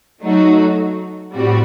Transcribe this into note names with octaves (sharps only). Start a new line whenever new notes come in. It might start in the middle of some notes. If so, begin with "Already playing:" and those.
F#3 A3 D#4 F#4
A2 G3 C4 F#4